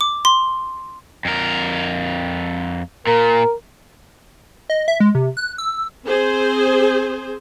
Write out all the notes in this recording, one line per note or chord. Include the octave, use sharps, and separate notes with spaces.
D6
C6
F2 A#4
A#2 A#4
D#5
E5
G#3
C3
F#6
E6
C4 G#4 C5